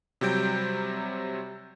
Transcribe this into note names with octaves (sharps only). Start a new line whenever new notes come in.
C3 F#3 G3 G6 D7